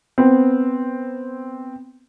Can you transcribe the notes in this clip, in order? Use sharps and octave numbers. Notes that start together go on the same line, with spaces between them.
B3 C4